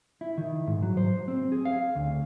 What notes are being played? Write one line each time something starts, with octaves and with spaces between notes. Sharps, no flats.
E4
D#3
G#2
F#3
C5
C4
G#4
F5
D2